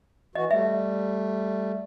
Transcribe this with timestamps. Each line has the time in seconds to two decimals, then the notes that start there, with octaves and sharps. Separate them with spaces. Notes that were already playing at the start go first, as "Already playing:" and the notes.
0.35 E3 F#4 D#5
0.51 G3 A3 E5